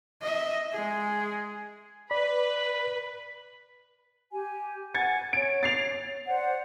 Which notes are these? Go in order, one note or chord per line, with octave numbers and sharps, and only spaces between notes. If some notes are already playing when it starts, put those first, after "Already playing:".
D#5 E5
G#3 G#4
B4 D5 B5
G4 G#5
F#5 G#5 G#6 A6 C#7
C#5 D7
A6 C7 F7
C5 D5 F#5